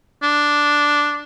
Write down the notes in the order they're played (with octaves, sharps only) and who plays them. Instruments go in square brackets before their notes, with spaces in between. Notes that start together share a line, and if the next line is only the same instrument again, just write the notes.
[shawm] D4